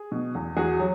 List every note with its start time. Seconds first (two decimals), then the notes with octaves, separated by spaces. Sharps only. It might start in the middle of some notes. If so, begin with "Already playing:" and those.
Already playing: G#4
0.12 B2
0.35 E2
0.57 E2 F#4 G#4
0.80 F#3